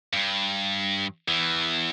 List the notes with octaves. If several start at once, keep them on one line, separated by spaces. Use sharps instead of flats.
G2
E2 E3